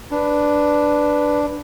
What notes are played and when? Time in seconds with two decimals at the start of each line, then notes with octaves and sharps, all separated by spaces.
0.11 D4 B4